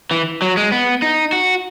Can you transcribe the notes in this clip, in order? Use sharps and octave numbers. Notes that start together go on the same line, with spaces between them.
E3
F#3
G#3
B3
D#4
F#4